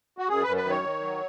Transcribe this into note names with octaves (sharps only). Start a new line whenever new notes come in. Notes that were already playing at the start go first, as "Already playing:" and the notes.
F#4
F#2 G#4
F#2 B4
B4
D#3
C#5
D#3
F#3